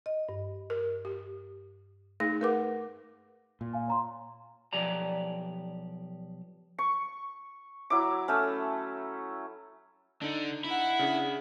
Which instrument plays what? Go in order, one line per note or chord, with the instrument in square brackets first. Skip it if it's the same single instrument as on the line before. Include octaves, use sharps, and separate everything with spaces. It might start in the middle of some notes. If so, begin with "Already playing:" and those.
[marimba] D#5
G2
[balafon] A#4
G4
[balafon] A3 D#4 G#4 [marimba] A#6
[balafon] A3 B4 F#5 [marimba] A#4 D6
[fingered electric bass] A#2
[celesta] F5 G#5
C#5 A#5 C6
[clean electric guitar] B1 F3 G4 D5 A#5
[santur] C#6
F#3 E4 D6
A3 C#4
[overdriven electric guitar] D3 [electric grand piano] D4 D#4
[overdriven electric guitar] E4 [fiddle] F#5 B5
[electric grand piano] C#3 D4 G#4